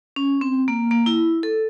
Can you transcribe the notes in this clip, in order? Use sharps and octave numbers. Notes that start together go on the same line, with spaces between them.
C#4
C4
A#3
A#3
E4
A4